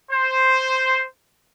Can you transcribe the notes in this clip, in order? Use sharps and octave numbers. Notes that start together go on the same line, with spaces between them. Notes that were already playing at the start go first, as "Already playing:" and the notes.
C5